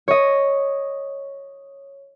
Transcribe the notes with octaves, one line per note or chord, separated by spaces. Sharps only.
C#5 D#5